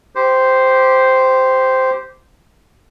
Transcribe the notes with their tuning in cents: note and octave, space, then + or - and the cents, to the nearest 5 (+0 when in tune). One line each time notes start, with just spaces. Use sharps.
G4 -5 C5 -5